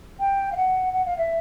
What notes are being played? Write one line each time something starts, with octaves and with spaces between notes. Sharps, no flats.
G5
F5
F#5
F#5
F5
E5